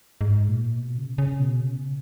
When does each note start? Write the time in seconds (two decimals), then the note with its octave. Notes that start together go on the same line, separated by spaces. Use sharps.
0.21 G#2
0.48 A#2
0.76 B2
0.98 C#3
1.18 C#3
1.39 B2
1.60 C#3